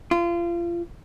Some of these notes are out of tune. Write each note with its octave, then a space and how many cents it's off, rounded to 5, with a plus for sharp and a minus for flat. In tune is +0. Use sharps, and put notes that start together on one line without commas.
F4 -30